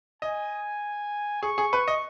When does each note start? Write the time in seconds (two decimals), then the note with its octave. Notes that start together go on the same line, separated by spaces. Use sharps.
0.22 D#5 G#5
1.43 G#4 C#6
1.58 G#4
1.73 B4
1.88 D#5